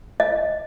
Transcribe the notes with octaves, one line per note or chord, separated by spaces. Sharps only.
D#5